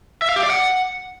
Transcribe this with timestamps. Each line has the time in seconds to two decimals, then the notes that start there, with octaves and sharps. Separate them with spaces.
0.22 E5
0.29 F5
0.36 G4
0.43 D5
0.50 F#5